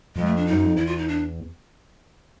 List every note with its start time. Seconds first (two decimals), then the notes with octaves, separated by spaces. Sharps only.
0.15 F2 G#3
0.26 A3
0.36 D4
0.46 D#4
0.52 F#2
0.65 F2
0.76 E2 E4
0.86 F4
0.98 D#4
1.08 D4